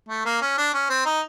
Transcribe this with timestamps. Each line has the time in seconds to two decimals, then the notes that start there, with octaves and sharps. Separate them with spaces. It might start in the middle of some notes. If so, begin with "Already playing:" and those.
0.09 A3
0.25 A#3
0.41 C#4
0.58 D4
0.74 C#4
0.90 C4
1.06 D#4